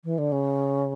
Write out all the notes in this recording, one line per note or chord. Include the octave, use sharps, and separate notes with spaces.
E3
D3
C#3